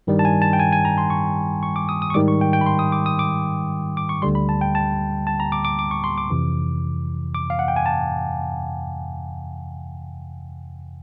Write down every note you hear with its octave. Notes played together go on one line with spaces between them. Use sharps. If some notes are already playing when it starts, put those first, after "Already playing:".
G2 D#3 G3
A5
G#5
A5
G5
G#5
G#5
A#5
C6
C#6
C#6
D6
D#6
D#6
C#6
G#2 D#3 G3 D6
C#6
G5
G5
B5
C6
D#6
D6
D#6
D6
D6
C#6
D2 D3 G3 C6
B5
A5
G5
A5
A5
A#5
D6
D6
D6
C#6
C6
D6
F2 C3 E3
D6
F5
F#5
G5
G#5
A5